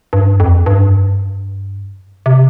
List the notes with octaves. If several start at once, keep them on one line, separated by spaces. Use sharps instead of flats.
G2
F2
G2
C3